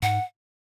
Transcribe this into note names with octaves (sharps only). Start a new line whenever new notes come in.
G#2 F#5